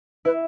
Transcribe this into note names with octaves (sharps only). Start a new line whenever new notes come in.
E4 B4